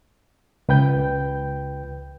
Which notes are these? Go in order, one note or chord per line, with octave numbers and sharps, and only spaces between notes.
C#2 B4 G5 G6